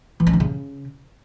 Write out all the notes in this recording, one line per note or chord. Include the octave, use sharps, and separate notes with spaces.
E3
C#4
E3
C#3